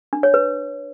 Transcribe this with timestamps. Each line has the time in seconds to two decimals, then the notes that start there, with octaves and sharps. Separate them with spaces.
0.13 D4
0.23 C#5
0.34 B4